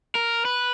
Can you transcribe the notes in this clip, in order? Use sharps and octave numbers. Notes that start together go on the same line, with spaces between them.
A#4
B4